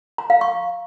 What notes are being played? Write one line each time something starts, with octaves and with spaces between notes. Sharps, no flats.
A#5
F5
C#6